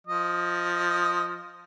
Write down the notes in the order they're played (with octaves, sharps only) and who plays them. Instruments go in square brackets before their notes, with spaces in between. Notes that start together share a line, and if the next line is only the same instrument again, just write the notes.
[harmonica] F3 D#5